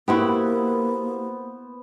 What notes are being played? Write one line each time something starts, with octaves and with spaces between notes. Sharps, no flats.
A#3 B3 E4 F#4 G4 C5